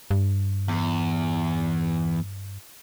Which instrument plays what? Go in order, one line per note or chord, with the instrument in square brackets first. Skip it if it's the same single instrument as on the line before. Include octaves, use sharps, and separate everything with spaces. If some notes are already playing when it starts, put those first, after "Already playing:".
[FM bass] G2
[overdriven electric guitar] E2